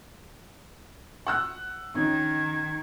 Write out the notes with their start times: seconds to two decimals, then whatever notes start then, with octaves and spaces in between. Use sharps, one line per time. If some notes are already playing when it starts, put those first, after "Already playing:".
1.27 F#5 E6 F#6
1.95 D#3 C#4 D#4 G#6